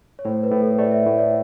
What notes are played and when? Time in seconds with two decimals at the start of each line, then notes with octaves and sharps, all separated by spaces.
0.19 C#5
0.25 A2 C5
0.43 B4
0.51 A2
0.60 A4
0.78 A3 D5
0.92 E5
1.05 A2
1.18 D5